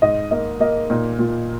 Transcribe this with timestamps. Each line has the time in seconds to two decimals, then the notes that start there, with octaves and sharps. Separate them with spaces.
0.02 G#2 D#5
0.31 A#3 D#5
0.60 A#3 D#5
0.90 A#2 D#4
1.19 A#2 F4